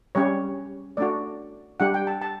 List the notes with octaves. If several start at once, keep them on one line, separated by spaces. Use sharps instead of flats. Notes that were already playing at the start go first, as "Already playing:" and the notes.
G3 C#4 G4 C#5
A3 D4 F#4 D5
G3 D4 G4 F#5
G5
A5
A5